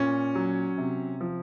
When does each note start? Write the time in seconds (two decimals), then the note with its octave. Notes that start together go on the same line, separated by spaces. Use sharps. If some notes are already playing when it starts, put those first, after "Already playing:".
Already playing: A#2 C#4
0.35 F#3
0.78 C3
1.21 F3